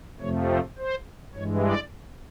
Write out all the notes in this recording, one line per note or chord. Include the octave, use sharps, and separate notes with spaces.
F2 C3 F3 A3 C#5
C5
C5
G2 E3 G#3 C#5
D5